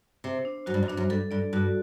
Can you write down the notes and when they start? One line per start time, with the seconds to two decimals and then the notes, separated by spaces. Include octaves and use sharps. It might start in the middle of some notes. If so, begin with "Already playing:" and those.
0.24 C3 C5
0.45 D4
0.66 F#2 F#4
0.74 G2
0.83 F#2
0.88 G2 D4
0.97 F#2
1.10 G2 A4
1.31 G2 D5
1.53 G2 F#4